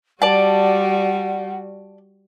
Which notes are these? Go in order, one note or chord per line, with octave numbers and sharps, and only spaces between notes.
G3 F#4 D5 F#5 A5